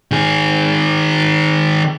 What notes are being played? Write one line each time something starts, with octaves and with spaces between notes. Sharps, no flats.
D#3 G#4